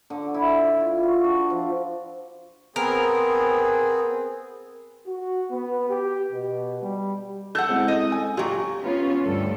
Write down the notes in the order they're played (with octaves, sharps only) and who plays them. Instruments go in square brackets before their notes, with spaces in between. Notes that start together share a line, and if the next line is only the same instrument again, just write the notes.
[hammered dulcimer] D3
E4
E5
D5
F4
F#4
D4
F3
[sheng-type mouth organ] B3 C4 G#4 [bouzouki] A#4
[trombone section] F#4
B3
G4
B2
G3
[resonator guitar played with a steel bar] A4 F#5 [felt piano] G6
[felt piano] G#3 C4 E4
[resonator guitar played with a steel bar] D#5
[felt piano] G#5
[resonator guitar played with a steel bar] A#2 F#3 [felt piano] G4
[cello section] B3 C#4 F4
D2 G2 G3 A4